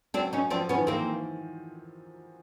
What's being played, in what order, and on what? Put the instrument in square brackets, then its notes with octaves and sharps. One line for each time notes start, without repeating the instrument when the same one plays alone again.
[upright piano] F#3 [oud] C4 D4
[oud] C#4 D#4
[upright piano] F3 [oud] C4 D4
[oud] B3 C#4
[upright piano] D#3
[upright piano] E3 [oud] A#3 C4